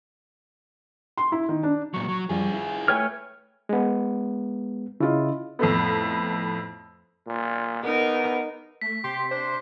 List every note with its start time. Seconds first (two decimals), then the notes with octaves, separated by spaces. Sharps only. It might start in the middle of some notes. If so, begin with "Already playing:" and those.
1.17 C6
1.32 E4
1.49 D#3
1.63 D4
1.94 A#2 F#3 C#6
2.08 F#3
2.29 F#2 F3 G3 F4 G#4
2.54 E4
2.88 A3 B4 C#5 G5 G#5 F6
3.69 G#3 B3
5.00 C#3 E4 F4 D#5
5.59 F2 A2 A3 B3
7.27 A#2
7.84 B3 D#4 A#4
8.81 A3 B6
9.04 C3 G4 C6
9.31 D4 C5